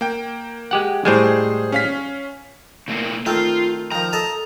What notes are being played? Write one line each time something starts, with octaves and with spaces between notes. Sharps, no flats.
A#3 G5
G#3 G4 F#5
A2 G3 G#3 G#4 C5
C#4 F5 B6
B2 A3 A#3
D#3 A3 C4 F4
D#3 F3 A#5
A4 D#5 A5